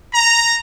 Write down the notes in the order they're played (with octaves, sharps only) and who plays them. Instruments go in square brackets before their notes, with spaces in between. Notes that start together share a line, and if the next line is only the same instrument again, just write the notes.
[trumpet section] A#5